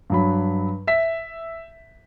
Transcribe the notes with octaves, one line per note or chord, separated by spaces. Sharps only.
G2 F#3 B5
E5 B6